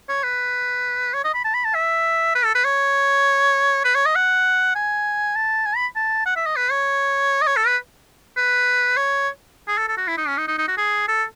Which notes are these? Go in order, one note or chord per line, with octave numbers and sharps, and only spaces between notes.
C#5
B4
C#5
D#5
B5
A5
B5
A5
E5
B4
A4
B4
C#5
B4
C#5
D#5
F#5
G#5
A5
G#5
B5
A5
F#5
E5
D#5
B4
C#5
D#5
C#5
A4
B4
B4
C#5
G#4
A4
A4
F#4
E4
D#4
C#4
D#4
D#4
D#4
F#4
G#4
A4